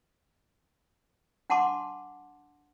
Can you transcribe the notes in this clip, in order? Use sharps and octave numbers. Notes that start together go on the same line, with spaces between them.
D4 F#5 A5 C6 D6